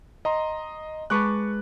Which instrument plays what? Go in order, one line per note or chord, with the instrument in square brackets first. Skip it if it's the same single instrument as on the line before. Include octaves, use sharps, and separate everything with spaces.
[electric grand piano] D#5 A#5 C6
[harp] G#3 B4 A5 [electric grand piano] C#6 D6 F#6